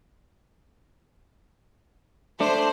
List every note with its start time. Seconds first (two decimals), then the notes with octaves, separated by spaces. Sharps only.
2.40 A3 D4 C5